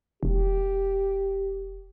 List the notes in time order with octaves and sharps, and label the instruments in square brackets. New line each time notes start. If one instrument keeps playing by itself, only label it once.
[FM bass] E1 [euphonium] G4